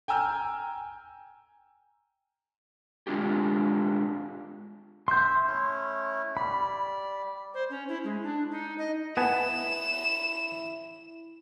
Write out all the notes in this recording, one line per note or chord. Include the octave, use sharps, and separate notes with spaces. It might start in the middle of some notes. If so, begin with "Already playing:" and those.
G5 G#5 A#5 E6 F6 G6
G#3 D4 F4 G4
E5 C6 G6
A3 C#4 E4
G3 D5 B5
C5
C#4
E4
G#3
D4
D#4
D#5
B3 E4 G#5 A5 E7